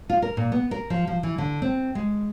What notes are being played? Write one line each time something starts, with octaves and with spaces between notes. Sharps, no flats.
F4
A#4
A#2
B3
A#4
F3
F3
E3
D3
C4
G#3